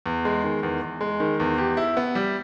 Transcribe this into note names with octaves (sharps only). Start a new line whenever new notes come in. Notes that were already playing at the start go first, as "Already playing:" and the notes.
E2
G#3
D#3
E2
E2
G#3
D#3
E2
G4
E4
B3
G3